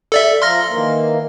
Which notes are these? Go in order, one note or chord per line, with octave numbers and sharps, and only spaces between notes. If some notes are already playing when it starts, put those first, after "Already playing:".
A4 D5 E5
F3 F5 A#5 C6 F6 A#6
D#3 E3 A#3